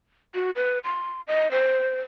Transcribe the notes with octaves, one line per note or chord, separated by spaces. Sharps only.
F#4
B4
C6
D#5
C5